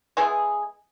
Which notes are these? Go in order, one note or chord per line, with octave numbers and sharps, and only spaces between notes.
G#3 B3 E4 G#4